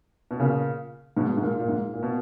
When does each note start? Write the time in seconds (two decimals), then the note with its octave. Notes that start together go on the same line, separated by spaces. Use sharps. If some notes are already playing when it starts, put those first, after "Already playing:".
0.31 B2
0.40 A#2 C#3
1.17 G#2 B2
1.37 G#2
1.43 A#2
1.59 A#2
1.68 G#2
1.93 A#2
2.03 B2